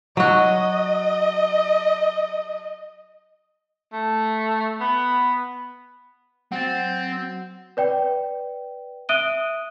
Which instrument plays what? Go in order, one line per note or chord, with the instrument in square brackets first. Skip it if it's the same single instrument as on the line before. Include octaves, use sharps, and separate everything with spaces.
[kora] F#3 F#4 [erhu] D#5
[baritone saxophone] A3
B3
[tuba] F#3 [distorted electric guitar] C4 [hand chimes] F#5 A6
[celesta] B4 D5 G5
E5 D#6 F#6 D7 D#7 G7